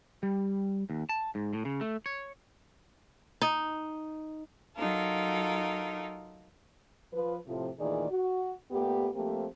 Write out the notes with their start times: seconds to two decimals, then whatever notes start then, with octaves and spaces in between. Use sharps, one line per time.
0.23 G3
0.90 D#2
1.09 A5
1.35 G#2
1.53 A2
1.65 C#3
1.81 A3
2.06 C#5
3.42 D#4
4.77 F#3 D#4 F4 A4 A#4
7.13 F3 B4
7.46 A2 C3 F3
7.79 D2 A#2 D#3 E3 G#4 D5
8.11 F#4
8.71 A#2 A3 B3 G4
9.14 F3 A3 A#3 C4 G4